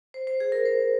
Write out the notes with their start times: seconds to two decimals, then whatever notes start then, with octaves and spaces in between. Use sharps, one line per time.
0.14 C5
0.27 C5
0.40 G#4
0.52 A#4
0.65 C5